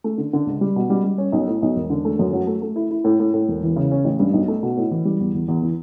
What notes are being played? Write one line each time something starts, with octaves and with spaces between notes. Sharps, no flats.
A3
D3
D3
C#2
G3
B2
G3
G3
C#4
B1
A2
B1
E1
D3
A3
F#2
F#3
A3
A3
E4
E4
A2
A2
A2
E1
E3
C#3
C#4
A1
G2
B1
A3
B2
A2
E3
G3
E2
E2
E2
E3